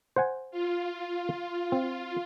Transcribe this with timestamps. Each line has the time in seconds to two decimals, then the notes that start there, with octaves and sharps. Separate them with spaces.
0.16 C5 F#5 G#5
0.51 F4
1.72 C4